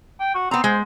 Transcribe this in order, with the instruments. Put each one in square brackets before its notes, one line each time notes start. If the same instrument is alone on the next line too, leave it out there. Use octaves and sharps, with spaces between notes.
[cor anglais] G5
F#4
[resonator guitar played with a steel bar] B3 A#5 [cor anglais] C4
[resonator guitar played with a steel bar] G#3 [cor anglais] C5